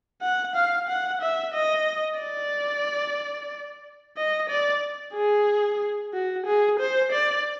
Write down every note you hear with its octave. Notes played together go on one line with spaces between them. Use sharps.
F#5
F5
F#5
E5
D#5
D5
D#5
D5
G#4
F#4
G#4
C5
D5